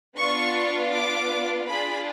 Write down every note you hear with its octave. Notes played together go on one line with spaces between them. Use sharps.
B3 D4 F4 C#6
D6
D4 F4 G#4 B5